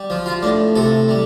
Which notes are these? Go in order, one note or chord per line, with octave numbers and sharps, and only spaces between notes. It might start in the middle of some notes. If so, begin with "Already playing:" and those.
Already playing: G3
F3
F4
A2 D4
C3 A4
G3